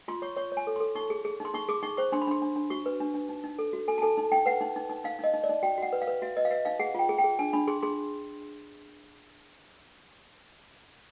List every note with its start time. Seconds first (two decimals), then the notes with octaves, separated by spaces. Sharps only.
0.08 F4 C6
0.22 C#5 C#6
0.36 C#5 C#6
0.52 C#5
0.57 G#5
0.67 A4
0.76 C6
0.80 A4
0.95 D#4 C#6
1.10 G#4
1.25 G#4
1.40 D#4 C6
1.54 D#4 C#6
1.69 G#4 D6
1.83 D#4 C#6
1.97 C5 C#6
2.12 D4 C6
2.21 B5
2.27 D4 C6
2.42 D4
2.56 D4
2.70 F#4 C#6
2.86 B4
3.00 D4
3.14 D4
3.29 D#4
3.44 D#4
3.59 A4
3.73 F#4
3.88 A4 G#5
3.98 A5
4.02 A4 G#5
4.17 D#4
4.32 D#4 G5
4.46 B4 F#5
4.61 D#4
4.76 D#4
4.90 D#4
5.04 D#4 F5
5.19 D#4 D#5
5.34 D#4
5.44 D5
5.49 D#4
5.63 F#4 G5
5.78 F#4 F#5
5.93 B4
6.02 F5
6.07 B4
6.22 F#4 E5
6.36 B4 D#5
6.45 F5
6.51 B4 E5
6.65 D#4 F5
6.79 G#4 F#5
6.95 F4 G5
7.09 G#4
7.18 G5
7.24 G#4
7.39 D4 G#5
7.53 D4 B5
7.68 G#4 C6
7.82 G#4 C6